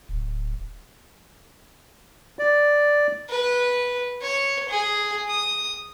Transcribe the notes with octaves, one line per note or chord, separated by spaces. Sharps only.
D1
D5
B4
C#5
G#4
D#6